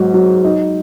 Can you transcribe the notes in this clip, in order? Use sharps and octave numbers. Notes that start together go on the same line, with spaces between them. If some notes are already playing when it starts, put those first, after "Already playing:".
Already playing: G#2 F#3
F#3
D#4